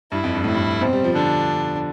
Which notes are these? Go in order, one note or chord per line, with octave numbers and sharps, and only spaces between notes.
G2 E4
F2
G2
A2 E4
G2
B2 C4
G3
F3
D3 D4